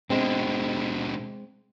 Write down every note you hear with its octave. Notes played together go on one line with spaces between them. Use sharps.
B2 D3 G#3 C4